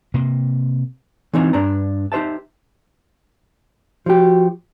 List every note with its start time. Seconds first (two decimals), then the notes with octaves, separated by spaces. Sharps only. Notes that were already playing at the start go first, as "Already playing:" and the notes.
0.14 C3 A#3
1.33 E3 C4 C#4 D#4 F4
1.53 G2 D4 D5 A#5
2.12 D#4 G4 C5 E5 A5
4.06 F3 F#4 G4